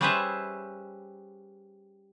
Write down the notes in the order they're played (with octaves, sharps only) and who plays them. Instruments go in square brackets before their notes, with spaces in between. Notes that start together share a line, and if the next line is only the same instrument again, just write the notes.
[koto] G3 C#4 G#4 B4 C5 E5